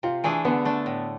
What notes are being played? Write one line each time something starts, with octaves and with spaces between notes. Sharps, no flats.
C3 F4
E3 A3 D4 G#4
D3 B3
A3 D4
A2